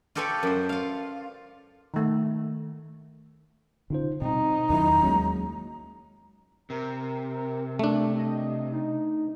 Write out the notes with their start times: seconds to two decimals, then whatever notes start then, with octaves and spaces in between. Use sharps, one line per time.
0.15 F4 G4 A4 B4 C#5 D5
0.43 F#2 C5
0.69 F4 F5
1.94 D#3 A3
3.90 D3 C#4 D#4 F4 C5
4.22 B2 G3 C4 D#4
4.70 E2 D#3 F#3 C#4 E4 A#5
5.03 D#2 F#3 G#3 A#3 C#4
6.70 C3 A#4
7.79 A3 D4
8.17 D#5
8.72 D#4